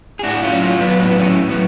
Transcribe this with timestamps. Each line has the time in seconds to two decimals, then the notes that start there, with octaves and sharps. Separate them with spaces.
0.19 G#4
0.23 A2 D4 F#4
0.43 C#4 F4
0.50 F#3
0.62 C#4 F4
0.75 F#3
0.81 B3 D4
1.00 A2 B3 D4
1.19 A3 C#4
1.25 A2
1.49 F#3 B3